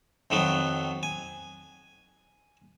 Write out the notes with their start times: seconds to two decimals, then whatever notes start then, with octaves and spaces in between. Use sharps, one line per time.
0.30 F2 D#3 F#3 B3
1.03 G#5